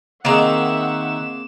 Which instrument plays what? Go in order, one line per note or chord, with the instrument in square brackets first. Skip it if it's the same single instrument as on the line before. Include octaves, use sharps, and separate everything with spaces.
[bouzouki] D#3 A#5 [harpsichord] A#3 C4 G#4 [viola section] E5 F#5 [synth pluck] E7